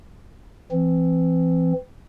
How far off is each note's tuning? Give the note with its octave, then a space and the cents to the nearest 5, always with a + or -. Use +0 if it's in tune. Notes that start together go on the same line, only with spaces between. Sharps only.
E3 +35 C4 +0